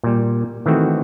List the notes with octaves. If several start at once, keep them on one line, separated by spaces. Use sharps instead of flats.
A#2 G3
D#3 E3 A3 C4 F#4